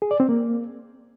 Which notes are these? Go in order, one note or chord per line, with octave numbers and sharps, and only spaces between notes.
G#4
D5
C4
A#3